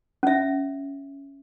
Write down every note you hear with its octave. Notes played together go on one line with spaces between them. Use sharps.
C#4 E5